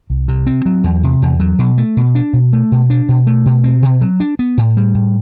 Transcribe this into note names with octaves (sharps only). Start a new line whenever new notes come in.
C2
C3
C4
F#3
E2
C3
E2
F#3
B2
A3
B2
D4
B2
A3
B2
D4
B2
A3
B2
C4
B2
F#3
D4
B3
A2
G3
A2